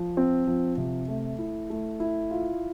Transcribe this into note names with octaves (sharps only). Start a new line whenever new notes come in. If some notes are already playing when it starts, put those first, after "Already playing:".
Already playing: F3
C4
F3
C3
A3
E4
A3
E4
F4